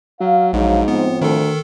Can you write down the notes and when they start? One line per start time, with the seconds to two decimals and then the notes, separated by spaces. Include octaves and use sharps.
0.20 F#3 F5
0.53 A#1 G#2 F#3 F5
0.88 A2 F3 B3 C4
1.22 D2 D#3 A4